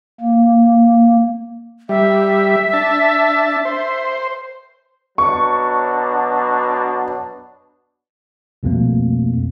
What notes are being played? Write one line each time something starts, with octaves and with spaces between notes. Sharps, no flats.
A#3
G3 E5
D4 A5
C5
B2 F#3 D4 C#6
C2 F2 B2 A3 A#3